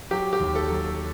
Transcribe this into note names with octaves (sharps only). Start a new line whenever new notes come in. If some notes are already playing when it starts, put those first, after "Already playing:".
F#3 G4
G4
D#2
A4
F#3